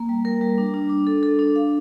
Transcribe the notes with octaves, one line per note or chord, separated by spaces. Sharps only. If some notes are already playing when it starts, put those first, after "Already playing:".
Already playing: A#3
G3
A#4
G3
D4
D4
D4
A4
A4
D4
F5